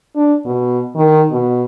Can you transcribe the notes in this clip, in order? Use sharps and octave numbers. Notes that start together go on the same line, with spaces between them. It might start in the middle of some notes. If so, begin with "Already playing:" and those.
D4
B2
D#3
B2